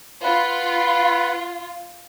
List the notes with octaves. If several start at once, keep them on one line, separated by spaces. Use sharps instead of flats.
F4 B4 F#5 B5